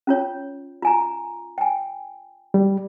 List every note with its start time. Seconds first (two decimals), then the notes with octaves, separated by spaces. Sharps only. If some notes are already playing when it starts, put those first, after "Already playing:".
0.07 C#4 F4 C#5
0.83 F4 G#5 A#5
1.58 G5 G#5
2.54 G3